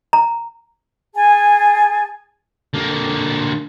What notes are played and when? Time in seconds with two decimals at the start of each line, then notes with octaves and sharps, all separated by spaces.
0.13 A#5
1.14 G#4 G#5 A5
2.74 D3 A#3